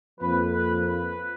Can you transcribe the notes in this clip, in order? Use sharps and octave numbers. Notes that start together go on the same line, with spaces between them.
F2 F3 A#3 B4
B4
B4